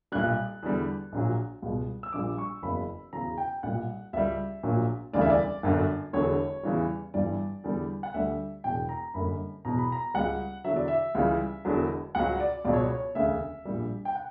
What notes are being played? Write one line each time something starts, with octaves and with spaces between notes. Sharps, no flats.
B1 A#2 G3 F#6
E2 D3 G3
A#1 A#2 F#3
C#2 B2 G3
E6
A#1 A#2 G3 D6
C#6
F#1 E2 C#3 F#3 B5
E2 C#3 F#3 A#5
G5
B1 A#2 G3 F#5
C#2 C#3 G3 E5
A#1 A#2 F#3
E1 D2 C#3 E3 G3 D5
E5
D5
G1 F#2 D3 F#3
E1 E2 D3 F#3 C#5
E2 C#3 E3 G3
G1 G2 E3 G3 D5
E2 D3 G3
F#5
D2 D3 G3 E5
E1 E2 B2 F#3 G5
A#5
F#1 F#2 D3 G3 B5
E2 B2 F#3 A#5
B5
A#5
C#2 C#3 G3 F#5
E2 D3 F#3 E5
D5
E5
C#2 C#3 E3 G3
E1 E2 D3 F#3
C#2 C#3 F#3 F#5
D5
C#2 B2 F#3 D5
C#5
C#5
E1 D2 C#3 E5
A#1 A#2 G3
G5
F#5